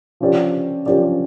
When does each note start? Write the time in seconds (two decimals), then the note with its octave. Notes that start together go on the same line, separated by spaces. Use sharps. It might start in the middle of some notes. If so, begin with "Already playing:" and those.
0.20 F3 C#4 G4 D5
0.86 F3 C#4 G4 D5